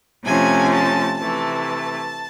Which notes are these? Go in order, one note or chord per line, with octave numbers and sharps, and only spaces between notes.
C3 F3 A3 C#4 G#5
A5
C3 E3 A3 A5